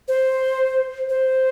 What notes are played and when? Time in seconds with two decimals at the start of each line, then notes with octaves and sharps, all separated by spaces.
0.08 C5
1.09 C5